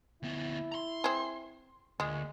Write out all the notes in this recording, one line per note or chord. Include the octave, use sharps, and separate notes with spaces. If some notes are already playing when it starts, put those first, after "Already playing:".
D2 B3 E4
A#5 C6
C4 G#4
D2 A#2 G#3